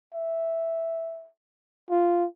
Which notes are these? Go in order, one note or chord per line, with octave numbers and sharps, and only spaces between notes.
E5
F4